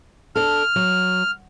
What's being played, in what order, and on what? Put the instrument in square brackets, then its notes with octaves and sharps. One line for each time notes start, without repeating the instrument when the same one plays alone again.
[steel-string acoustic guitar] D4 A4 [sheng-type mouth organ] F6
[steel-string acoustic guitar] F#3